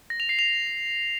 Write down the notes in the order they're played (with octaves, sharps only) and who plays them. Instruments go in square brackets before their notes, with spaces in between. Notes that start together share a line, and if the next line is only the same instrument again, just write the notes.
[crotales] A#6
F7
C7
F7